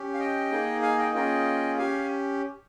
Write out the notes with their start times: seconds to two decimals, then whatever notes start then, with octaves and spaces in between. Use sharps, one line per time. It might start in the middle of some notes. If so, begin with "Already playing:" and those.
Already playing: C#4 G4
0.14 F5
0.20 D#5 G5
0.51 A#3 D#4 G#4
0.82 F5 G#5
0.98 D#5 G5
1.14 A#3 C#4 F4 G#4 D#5 G5
1.78 C#4 G4 F5 G#5